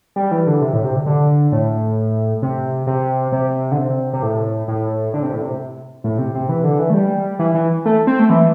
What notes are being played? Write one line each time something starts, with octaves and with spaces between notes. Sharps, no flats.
G3
E3
D3
C3
A2
C3
D3
D3
A2
C3
C3
C3
D3
C3
C3
A2
A2
D3
C3
A2
C3
A2
C3
C3
E3
D3
E3
A3
G3
E3
E3
A3
C4
A3
E3